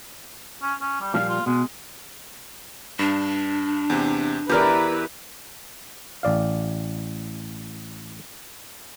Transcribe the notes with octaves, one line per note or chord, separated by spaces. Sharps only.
C#4
C#4
G3
A#2 F3 G3 F5
F4
B2 G#3
G2 D4
E2 C3
E2 E4 G4 A#4 B4 D5 F6
A1 D5 F5